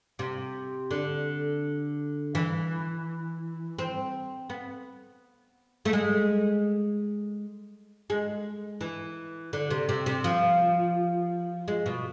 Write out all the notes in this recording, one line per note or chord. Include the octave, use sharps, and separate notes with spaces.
C3
D3
E3
C4
B3
A3
G#3
G#3
E3
D3
C3
C3
C3
F3
G#3
B2